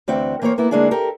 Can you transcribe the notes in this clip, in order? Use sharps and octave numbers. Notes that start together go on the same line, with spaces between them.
D2 E3 C4 E5 F#5 G5
E3 A#3 A#4 C5 C#5
A#3 B3 E4
D3 G#3 A#3 D4 E4 G#4
G4 A4 A#4